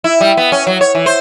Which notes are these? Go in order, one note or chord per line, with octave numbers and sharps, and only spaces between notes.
E4
G3
B3
C#4
F#3
C#5
E3
C5